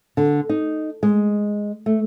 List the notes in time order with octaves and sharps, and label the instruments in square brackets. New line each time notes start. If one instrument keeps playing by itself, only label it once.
[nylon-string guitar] D3
D#4
G#3
A3